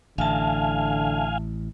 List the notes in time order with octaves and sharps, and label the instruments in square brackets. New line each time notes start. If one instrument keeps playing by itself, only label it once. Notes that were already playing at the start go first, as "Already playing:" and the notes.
[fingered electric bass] A1 [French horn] D3 [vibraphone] E5 A5 [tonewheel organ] F5 G#5